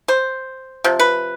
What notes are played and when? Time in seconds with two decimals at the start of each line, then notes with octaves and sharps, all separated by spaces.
0.08 C5
0.84 C3 F3
0.99 B4